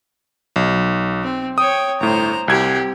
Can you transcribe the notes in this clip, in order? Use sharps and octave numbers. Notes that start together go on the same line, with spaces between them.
B1
C4
C#5 G5 D#6
G1 A2 C5 A#5
C2 C4 G4 G#6